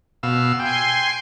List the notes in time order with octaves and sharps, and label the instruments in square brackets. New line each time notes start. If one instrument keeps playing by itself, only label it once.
[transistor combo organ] B2 F5 E6
[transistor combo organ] G5 [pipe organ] G#5 C6